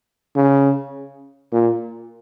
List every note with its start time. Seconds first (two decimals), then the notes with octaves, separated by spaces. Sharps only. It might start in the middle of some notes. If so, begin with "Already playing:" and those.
0.36 C#3
1.52 A#2